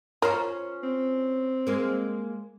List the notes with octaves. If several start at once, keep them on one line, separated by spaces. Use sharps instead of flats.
C#4 F4 A#4 C5
C4
G#3 A#3